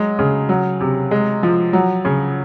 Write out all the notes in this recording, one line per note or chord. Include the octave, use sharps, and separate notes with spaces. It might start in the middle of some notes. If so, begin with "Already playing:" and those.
Already playing: F#3 G#3
C#3
F#3
C3
G#3
F3
F#3
C#3